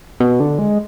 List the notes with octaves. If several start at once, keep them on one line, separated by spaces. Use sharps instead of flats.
B2
D3
G#3